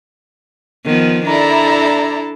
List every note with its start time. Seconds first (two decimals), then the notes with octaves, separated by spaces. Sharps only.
0.85 D#3 F3 B3
1.25 D4 E4 A4 D5 A#5